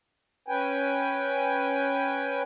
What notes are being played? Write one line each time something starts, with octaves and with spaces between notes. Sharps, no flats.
C#4 B4 G5 G#5